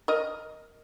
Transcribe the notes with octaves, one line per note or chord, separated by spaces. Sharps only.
A#4 D#5